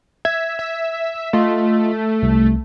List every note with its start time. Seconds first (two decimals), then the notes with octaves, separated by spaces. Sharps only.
0.25 E5 G#6
0.59 E5
1.33 A3 F4 D#5
2.23 C2